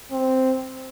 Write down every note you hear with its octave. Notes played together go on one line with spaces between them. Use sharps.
C4